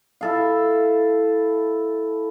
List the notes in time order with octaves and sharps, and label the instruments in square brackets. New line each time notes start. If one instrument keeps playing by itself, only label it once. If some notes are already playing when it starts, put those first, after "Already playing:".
[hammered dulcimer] E4 A4 F5